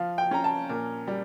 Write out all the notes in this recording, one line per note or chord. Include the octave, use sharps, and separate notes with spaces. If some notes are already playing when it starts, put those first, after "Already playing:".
Already playing: F3 F5
G5
C#4 A#5
A5
A#2 A#4
G3